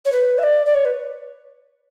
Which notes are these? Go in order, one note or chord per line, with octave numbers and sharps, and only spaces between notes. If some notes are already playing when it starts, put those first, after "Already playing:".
C#5
B4
E5
D5
D5
C#5
B4